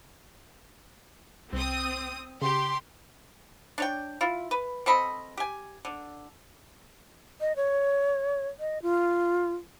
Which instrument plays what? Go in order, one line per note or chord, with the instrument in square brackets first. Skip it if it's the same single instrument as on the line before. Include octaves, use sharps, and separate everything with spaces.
[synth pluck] C2 [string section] C4 D#6
[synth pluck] C#3 [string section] G4 [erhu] C6
[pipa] D4 C#5 G5
E4 F4
B4
C4 A4 D#5 B5
G4 G#5
D3
[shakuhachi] D#5
C#5
D#5
F4